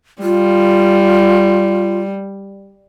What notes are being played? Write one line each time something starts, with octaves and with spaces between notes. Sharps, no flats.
G3 F4